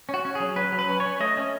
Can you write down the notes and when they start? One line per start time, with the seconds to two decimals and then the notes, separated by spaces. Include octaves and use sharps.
0.09 C#4
0.14 F#4
0.25 C#4
0.35 F#3 G#4
0.56 C#4 B4
0.72 F#3
0.79 B4
0.89 C#4
1.00 C#5
1.05 C#4
1.20 A3 D#5
1.37 C#4